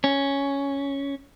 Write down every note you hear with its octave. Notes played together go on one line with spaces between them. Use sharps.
C#4